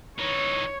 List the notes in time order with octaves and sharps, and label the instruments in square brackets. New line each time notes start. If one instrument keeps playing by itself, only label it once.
[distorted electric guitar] E3 D#4 [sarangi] C#5